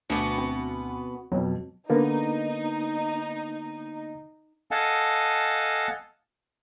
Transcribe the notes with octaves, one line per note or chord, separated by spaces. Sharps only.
D2 B2 B3 D6
C4
F2 B2 F#3
D3 A#3 B3 D#4
A4 D#5 F5 F#5 G#5 A5